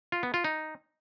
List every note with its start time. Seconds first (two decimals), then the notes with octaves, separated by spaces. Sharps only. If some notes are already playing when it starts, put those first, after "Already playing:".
0.12 F4
0.23 B3
0.34 F4
0.44 D#4